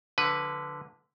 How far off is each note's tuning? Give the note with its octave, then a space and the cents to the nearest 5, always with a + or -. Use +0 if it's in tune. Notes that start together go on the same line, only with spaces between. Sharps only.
D3 +0 F3 +35 B4 +0